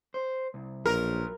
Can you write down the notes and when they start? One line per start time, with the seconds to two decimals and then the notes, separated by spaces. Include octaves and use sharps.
0.14 C5
0.54 C2
0.86 A#1 F#3 A#4 B4